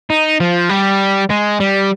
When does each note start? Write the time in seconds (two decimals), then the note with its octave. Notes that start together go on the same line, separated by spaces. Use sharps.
0.10 D#4
0.40 F3
0.69 G3
1.30 G#3
1.60 G3